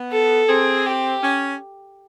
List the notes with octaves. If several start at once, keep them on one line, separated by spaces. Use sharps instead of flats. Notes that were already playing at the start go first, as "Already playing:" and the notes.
Already playing: B3
A4
C4 G#4
G4
C#4